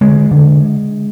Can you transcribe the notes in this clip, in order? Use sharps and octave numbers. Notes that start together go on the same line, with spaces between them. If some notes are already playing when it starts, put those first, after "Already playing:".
D3 G#3
D3